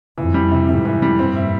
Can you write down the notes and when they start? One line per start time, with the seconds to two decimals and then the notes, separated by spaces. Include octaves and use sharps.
0.17 F2 E3
0.34 G3
0.51 C3
0.68 F2 G#2 C3
0.85 E3
1.02 G3
1.19 G2 A#2 C4
1.36 E4